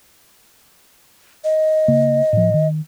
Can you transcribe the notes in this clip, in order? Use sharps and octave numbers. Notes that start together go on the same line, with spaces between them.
D#5
C#3 A#3
A2 F3
D#3